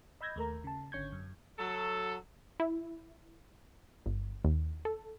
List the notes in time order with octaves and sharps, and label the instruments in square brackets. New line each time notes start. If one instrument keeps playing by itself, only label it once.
[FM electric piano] D#5 B5 E6 G6 G#6 A#6
D#2 A3 A#4 A#5
C#3 A5
G#1 D3 C#4 C#6 G6 G#6
F#2
[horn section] F#3 A4
[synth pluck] E4
G1
D#2
A4